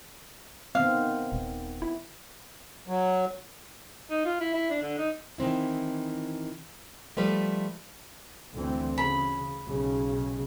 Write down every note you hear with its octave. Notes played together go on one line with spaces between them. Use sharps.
D#3 B3 C4 F5
D#1
E4
F#3
D#4
F4
E4
E4
D4
D3
D#4
D#3 E3 C4 E4
F3 G3 A3 B4
D2 E3 C4
C#3 B5
B1 C#3